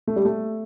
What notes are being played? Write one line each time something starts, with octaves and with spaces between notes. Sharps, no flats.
A3
G3
A3